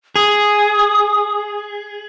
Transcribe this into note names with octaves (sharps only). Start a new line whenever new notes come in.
G#4 D#6